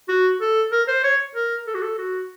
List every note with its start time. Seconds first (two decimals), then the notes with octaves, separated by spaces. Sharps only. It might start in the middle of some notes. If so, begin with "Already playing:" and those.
0.08 F#4
0.41 A4
0.72 A#4
0.88 C5
1.04 C#5
1.35 A#4
1.67 A4
1.74 F#4
1.82 A4
1.98 F#4